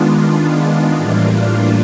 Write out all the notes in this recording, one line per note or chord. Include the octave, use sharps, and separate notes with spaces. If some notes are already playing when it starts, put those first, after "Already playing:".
Already playing: D#3 G#3 B3 D4 F4
F4
A2 E3 G3 A#3 D4